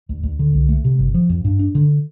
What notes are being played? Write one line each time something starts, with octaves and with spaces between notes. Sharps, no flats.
D2
D2
D3
C2
A3
C3
G1
F3
F2
G2
D4
D3